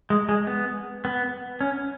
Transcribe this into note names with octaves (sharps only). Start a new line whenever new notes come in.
G#3
G#3
B3
B3
C#4